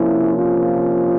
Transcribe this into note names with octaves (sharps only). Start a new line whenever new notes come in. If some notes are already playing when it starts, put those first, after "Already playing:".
Already playing: C3 F3 A#3 C#4 E4
F4